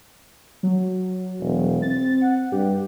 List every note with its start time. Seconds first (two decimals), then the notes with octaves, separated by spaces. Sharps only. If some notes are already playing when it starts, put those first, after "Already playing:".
0.63 F#3
1.40 E1
1.82 C4 A6
2.21 F#5
2.52 G2 G4